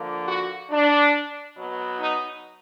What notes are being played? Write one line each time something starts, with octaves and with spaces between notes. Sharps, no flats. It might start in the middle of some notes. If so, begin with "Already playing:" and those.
Already playing: D3 F3 A#3
F#4
D4
B2 F#3 B3
D#4